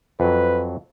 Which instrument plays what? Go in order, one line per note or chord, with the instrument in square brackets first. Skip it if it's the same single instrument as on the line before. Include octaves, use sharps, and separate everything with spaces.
[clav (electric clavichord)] F2 F#3 [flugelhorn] B4